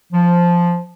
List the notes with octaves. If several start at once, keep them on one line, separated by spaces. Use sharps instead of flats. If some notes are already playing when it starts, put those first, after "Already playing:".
F3